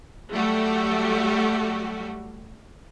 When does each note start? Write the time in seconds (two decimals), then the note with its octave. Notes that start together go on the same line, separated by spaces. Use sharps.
0.31 F#3 G3 A3 F#4 G4